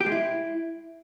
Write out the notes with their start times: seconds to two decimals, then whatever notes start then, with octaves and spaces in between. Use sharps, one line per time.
0.01 G4
0.06 G#3
0.12 E4